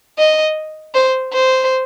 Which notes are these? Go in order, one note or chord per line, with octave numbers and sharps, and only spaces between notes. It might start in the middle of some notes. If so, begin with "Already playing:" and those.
D#5
C5
C5